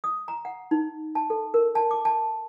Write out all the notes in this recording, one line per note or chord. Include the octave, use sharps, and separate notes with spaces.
D#6
A#5
F#5
D#4
A5
A4
A#4
A5
D6
A5